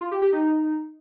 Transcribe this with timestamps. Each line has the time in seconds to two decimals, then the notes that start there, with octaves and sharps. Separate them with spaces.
0.01 F4
0.11 G4
0.22 G4
0.32 D#4